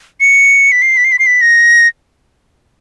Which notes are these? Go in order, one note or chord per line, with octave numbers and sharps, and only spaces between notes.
C#7
B6
C7
B6
C7
B6
C7
B6
A#6